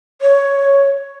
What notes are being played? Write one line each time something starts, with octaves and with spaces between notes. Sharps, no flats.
C#5